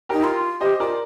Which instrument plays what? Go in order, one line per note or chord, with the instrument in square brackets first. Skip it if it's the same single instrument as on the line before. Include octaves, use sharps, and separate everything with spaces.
[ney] D#4 [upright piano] G4 A#4
[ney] F4
[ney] G4 [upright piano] C5 D#5
[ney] F4 [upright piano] A#4 D5